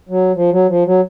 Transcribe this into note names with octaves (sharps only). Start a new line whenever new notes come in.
F#3
F3
F#3
F3
F#3